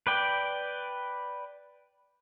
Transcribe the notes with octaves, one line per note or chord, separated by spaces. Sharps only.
B4 D5 G5